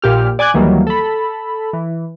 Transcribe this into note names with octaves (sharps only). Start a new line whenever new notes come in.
A#1 A#2 G4 F6
D5 G#5 D6 F#6 G#6
D2 D#3 E3 F#3 G3 A#3
A4 B5
E3